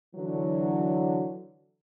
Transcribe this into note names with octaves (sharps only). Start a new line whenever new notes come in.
D3 E3 F#3